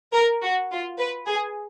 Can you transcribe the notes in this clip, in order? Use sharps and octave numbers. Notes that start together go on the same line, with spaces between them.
A#4
F#4
F4
B4
G#4